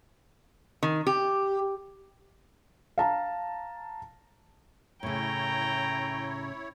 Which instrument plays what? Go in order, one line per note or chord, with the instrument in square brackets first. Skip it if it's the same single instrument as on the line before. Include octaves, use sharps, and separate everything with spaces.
[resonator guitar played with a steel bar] D#3
G4
[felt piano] F5 A5 A#5
[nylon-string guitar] A2 C#3 [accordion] E4 C#5 [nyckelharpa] G5 [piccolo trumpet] A#5